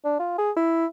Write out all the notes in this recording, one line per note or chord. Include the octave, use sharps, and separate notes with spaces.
D4
F4
G#4
E4